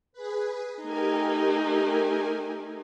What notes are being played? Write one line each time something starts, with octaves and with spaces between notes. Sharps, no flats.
G#4 B4
A3 D#4 G4 A#4 G#5